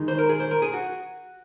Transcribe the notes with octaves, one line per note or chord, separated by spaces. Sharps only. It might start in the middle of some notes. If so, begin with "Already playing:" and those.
Already playing: D#3 G#3 D#4
C5
A#4
G#4
C5
A#4
G#4
F#4